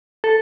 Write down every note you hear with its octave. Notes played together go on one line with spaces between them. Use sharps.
A4